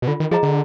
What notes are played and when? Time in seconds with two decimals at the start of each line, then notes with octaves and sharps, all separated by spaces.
0.02 B2
0.07 D3 F4
0.20 D#3
0.31 F3 G#4 D#5 A#5
0.43 D3